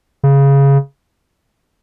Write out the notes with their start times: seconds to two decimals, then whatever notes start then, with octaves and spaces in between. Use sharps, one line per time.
0.23 C#3